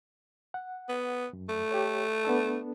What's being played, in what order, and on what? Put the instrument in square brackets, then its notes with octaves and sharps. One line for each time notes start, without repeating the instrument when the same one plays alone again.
[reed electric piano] F#5
[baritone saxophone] B3
[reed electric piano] F#2
[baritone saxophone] A3
[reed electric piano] G4 A4 C#5
B3 D4 A4